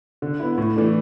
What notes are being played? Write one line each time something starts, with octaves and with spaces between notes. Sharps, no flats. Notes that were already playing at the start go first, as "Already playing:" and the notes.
D3
B3 E4
A2
E3 A3 D4